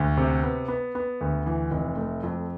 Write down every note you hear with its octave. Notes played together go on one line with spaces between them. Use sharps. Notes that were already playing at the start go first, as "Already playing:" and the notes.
Already playing: D2
C3
B3
B3
B3
D2
E3
F1
A3
F2